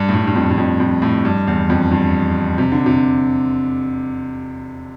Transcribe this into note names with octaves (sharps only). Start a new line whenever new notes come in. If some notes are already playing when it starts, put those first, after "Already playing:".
Already playing: G2
A2
G2
G2
F2
G2
F2
F2
A2
G2
E2
F2
G2
C3
D3
C3